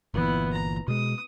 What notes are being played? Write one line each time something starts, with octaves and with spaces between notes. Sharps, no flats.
G1 A#2 E3 B3 E4
A#5
B2 G#3 D#6